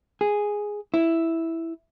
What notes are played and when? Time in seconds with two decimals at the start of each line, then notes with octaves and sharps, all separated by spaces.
0.21 G#4
0.94 E4